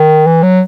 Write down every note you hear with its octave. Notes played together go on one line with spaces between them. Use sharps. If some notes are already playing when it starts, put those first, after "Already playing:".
Already playing: D#3
E3
F#3